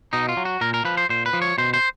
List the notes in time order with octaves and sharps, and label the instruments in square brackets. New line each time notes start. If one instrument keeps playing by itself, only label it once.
[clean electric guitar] B2 D#4
F4
F#3
F#4
A#2 A#4
A#4
F3 B4
C5
A#2 C5
B4
F3
C#5
B2 C5
C5